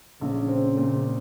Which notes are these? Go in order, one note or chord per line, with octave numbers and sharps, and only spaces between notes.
A#1 C#3
C4
A#2